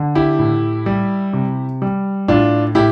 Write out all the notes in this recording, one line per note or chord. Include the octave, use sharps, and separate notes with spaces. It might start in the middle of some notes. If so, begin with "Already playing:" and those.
Already playing: D3
E4 G4
A2
G3
C3
G3
A2 D4 F4
A2 E4 G4